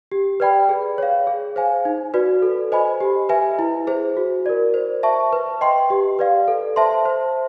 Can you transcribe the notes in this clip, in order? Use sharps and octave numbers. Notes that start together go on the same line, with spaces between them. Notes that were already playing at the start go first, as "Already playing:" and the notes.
G4
B4 D5 G5 B5
G#4
C#5 F5
G#4
C5 F5 G#5
D#4
F#4 B4 D5
A4
C5 D#5 G#5 B5
G4
B4 E5 G#5
E4
G#4 C5
F#4
A#4 D5
C5
E5 A5 C#6
B4
D#5 G5 C6
G4
B4 D5 F5
A4
C5 E5 A5 C6
C5